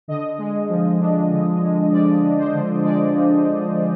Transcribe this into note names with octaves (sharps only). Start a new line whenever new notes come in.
D3 D#5
G#3
F3
D4
D3
G#3
F3 D5
D4
C5
D3
G#3 D5
F3